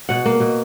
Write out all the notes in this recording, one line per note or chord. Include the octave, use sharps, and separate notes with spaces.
B2 F#5
A#3
B2